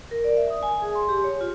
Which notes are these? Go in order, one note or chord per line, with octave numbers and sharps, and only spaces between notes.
A#4
D5
E5
D#6
G#5
G#4
C6
G4
C#5
F4